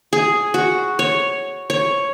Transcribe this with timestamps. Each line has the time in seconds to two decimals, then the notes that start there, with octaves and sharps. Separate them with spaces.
0.13 G#4
0.54 F#4
0.99 C#5
1.70 C#5